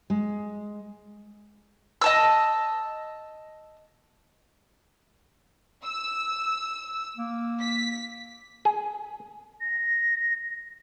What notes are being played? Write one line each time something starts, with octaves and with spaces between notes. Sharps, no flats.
G#3
D#5 A5 E6
E6
A#3
B6
G#4
A#6